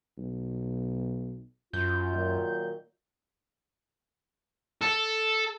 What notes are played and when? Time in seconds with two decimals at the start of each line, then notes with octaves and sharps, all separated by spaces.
0.18 B1
1.73 F#2 F4 G6
2.13 A#2 D#3 F#3
4.82 A4